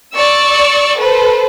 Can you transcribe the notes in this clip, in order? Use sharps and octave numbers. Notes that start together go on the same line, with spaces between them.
D5 C#6 E6
A4 B4 C5